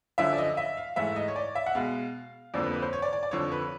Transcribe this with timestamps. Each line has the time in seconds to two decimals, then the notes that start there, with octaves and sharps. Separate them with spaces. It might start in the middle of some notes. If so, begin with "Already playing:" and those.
0.18 F#2 D3 F3 E5
0.33 D5
0.38 D#5
0.57 E5
0.77 F5
0.96 G#2 E3 A3 E5
1.16 D#5
1.28 C#5
1.36 D5
1.55 E5
1.66 F#5
1.75 B2 G#3 F5
2.54 F2 D3 F3 A#3 D5
2.63 B4
2.73 B4
2.82 C5
2.93 C#5
3.02 D5
3.13 D5
3.23 D5
3.31 F2 D3 F3 C#5
3.52 B4